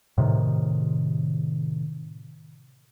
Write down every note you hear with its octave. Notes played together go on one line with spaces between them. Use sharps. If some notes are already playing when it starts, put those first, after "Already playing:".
A2 C3 D#3